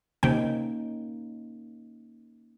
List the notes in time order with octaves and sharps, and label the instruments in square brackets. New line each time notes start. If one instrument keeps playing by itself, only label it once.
[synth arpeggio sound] C3 G5 [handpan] A#3 C#4 D#4